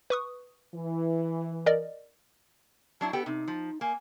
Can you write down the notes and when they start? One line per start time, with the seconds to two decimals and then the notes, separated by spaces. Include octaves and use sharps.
0.10 B4 C#6 D#6
0.74 E3
1.66 A#4 D5 D#5
3.01 F#3 D4 E4 A5
3.13 B3 G4 A4 G5
3.26 C3 D#4
3.48 F3
3.81 A#3 G#5